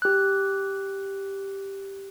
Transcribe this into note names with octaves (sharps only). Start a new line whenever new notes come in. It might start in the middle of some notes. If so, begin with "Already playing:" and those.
G4 F#6